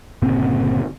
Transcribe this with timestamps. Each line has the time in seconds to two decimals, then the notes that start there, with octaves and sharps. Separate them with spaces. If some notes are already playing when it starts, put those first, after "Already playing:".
0.22 G1 A#2 C#3 C4